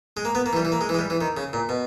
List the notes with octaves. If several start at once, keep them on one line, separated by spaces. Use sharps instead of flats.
G#3
A#3
B3
A#3
E3
G3
E3
A#3
G#3
E3
G#3
G3
E3
D#3
C#3
A#2
B2